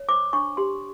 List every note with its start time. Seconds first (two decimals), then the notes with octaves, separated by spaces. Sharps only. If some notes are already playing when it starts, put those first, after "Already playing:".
Already playing: C#5
0.09 C5 D6
0.33 D4 C#6
0.57 G4 C6